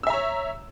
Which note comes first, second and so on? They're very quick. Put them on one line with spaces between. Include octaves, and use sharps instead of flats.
E6 E5 A#5 C#5